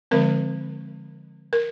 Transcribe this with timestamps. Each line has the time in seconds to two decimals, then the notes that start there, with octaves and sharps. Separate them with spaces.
0.11 D3 F3 G#3 C4 A#4
1.53 A#4